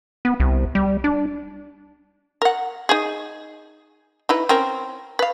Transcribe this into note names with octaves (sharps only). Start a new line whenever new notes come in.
B3
C2
G3
D4
A#4 F#5
D#4 G#4
D#4 E4 B4
C4 C#4 A#4
B4 F5